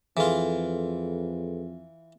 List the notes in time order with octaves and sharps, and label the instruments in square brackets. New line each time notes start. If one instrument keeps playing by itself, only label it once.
[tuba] F2 [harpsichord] E3 F4 [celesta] G#4 A4 B4